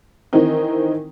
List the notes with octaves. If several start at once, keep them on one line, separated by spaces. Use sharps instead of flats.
D#3 E3 C4 D#4